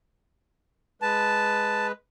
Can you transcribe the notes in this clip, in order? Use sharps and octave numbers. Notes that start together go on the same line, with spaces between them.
G#3 B4 A5